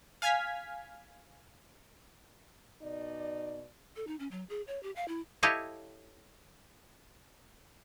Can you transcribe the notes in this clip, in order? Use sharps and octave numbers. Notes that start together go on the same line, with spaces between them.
F5 G#5 F6 G#6 B6
B2 D#4 D5
A4
D#4
C#4
F#3
G#4
C#5
G4
F5
E4
E4 G4 A4 C#5 D#5 F5